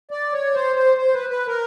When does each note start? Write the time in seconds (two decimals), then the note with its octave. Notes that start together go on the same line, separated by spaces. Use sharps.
0.11 D5
0.33 C#5
0.54 C5
0.76 C5
0.97 C5
1.14 B4
1.30 B4
1.47 A#4